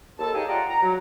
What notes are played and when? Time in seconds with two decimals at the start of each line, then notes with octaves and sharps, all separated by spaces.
0.19 D#2 A4 A5
0.35 D#4 G4 G#4 C#5 F5 G#5
0.49 F4 D5 F#5 G5 A#5
0.70 A#5
0.83 F#3